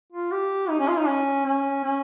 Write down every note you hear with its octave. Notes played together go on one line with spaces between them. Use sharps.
F4
G4
D#4
C#4
F4
D#4
C#4
C#4
C#4